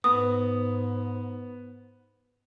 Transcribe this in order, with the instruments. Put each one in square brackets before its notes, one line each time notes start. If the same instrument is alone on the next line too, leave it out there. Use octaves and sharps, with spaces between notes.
[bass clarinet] G#2 [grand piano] B3 [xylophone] D#6